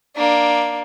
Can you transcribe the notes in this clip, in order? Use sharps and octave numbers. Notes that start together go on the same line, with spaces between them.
A#3 D4